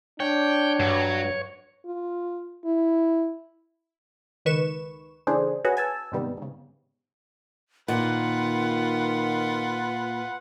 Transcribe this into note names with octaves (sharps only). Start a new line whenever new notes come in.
D4 C#5 G5
G2 F#3
F4
E4
C#2 D#3 B4 C#6 E7
C#3 E3 A3 D4 G#4 C5
C#4 F#4 G#4 B4
G#5 A5 E6
G#2 C3 D#3 G3 B3
G#2 C#3
A#2 D#3 F4 B4 F#5